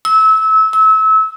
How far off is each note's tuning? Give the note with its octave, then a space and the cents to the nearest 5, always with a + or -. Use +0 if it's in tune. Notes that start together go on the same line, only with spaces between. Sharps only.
E6 -25
E6 -30